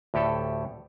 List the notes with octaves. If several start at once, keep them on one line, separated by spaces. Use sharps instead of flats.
D2 A2 G4 A4